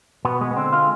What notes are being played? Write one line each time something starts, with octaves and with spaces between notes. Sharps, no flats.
B2 B3
G#3 B3
B3
D3 C4
G#3 F4